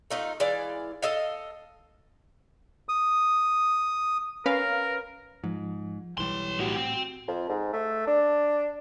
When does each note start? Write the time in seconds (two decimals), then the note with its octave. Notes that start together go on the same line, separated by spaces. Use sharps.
0.11 A3 D#4 F4
0.40 E3 G#3 D5 F5
1.02 A4 D#5 F5
2.89 D#6
4.46 C#4 A#4 B4 F5
5.44 G#2 F3
6.18 B1 E3 G3 C#5 C6
6.59 A2 B3 F#4 G4
6.76 C4
7.28 F2
7.49 G#2
7.73 A3
8.07 D4